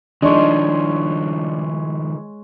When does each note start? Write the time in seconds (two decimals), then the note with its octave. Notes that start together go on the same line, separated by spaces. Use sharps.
0.22 D#3 F3 G#3 D4 C#5